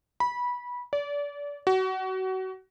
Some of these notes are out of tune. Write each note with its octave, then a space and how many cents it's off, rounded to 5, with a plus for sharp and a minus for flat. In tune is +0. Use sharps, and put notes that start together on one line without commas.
B5 -20
D5 -30
F#4 +25